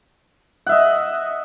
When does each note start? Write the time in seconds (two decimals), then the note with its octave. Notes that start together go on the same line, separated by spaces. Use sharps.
0.66 F#5
0.69 E5
0.72 D#5